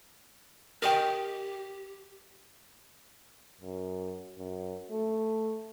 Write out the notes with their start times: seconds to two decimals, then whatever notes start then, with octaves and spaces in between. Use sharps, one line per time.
0.82 G4 A#4 D#5 G5
3.61 F#2
4.38 F#2
4.91 A3